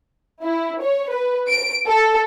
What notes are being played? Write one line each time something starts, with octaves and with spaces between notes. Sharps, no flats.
E4
C#5
B4
D7
A4